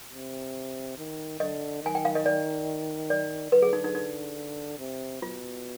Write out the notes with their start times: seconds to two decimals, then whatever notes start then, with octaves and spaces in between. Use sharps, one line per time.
0.13 C3
0.98 D#3
1.40 D3 D#5
1.83 D#3 G#5
1.95 G5
2.05 F5
2.15 D#5
2.26 D5
3.10 D5
3.52 D3 B4
3.62 G#4
3.73 D#4
3.84 D#4
3.95 D#4
4.79 C3
5.22 B2 F4